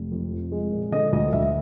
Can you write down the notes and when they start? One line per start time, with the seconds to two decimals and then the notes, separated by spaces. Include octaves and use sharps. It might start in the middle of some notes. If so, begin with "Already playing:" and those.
Already playing: F1
0.11 F2
0.32 F3
0.52 G#3
0.72 A#2
0.92 D3 D#5
1.12 D2 D#5
1.33 D2 E5